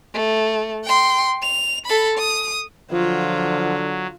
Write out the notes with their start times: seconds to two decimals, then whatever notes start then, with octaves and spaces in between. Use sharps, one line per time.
0.14 A3
0.84 G5 C6
1.42 F7
1.86 A4 B5
2.18 D#6
2.92 D3 F3 F#3 F4